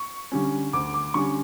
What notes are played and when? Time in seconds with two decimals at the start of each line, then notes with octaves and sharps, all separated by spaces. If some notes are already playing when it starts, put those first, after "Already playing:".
Already playing: C#6
0.32 D3 G3 C#4
0.73 D2 D6
0.94 D6
1.14 D3 G3 C#4 C#6